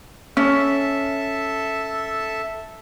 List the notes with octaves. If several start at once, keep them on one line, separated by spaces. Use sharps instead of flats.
C#4 A4 E5